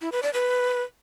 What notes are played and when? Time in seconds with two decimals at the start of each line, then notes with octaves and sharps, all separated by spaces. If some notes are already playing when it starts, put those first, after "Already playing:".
0.01 E4
0.12 B4
0.23 D5
0.33 B4